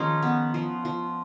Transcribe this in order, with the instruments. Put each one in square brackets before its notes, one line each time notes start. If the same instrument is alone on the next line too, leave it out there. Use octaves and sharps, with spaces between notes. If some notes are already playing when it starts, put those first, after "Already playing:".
Already playing: [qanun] D#3 F3 A#3 C#4 D#4 F4 G#4
B3
F3
F3